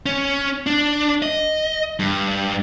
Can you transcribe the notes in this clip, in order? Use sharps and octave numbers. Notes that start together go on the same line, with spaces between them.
C#4
D4
D#5
G2